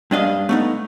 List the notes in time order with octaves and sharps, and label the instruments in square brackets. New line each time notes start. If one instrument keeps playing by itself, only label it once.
[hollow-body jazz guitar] G2 D4 D#5 F5
A3 B3 D#4